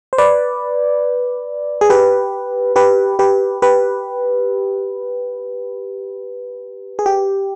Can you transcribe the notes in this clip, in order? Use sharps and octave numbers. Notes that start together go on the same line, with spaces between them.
C5
B4 D5
G#4
G4 B4
G4 B4
G4 B4
G4 B4
G#4
G4